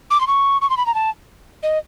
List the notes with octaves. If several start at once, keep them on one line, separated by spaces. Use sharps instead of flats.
D6
C6
C#6
C#6
C6
B5
A#5
A5
D#5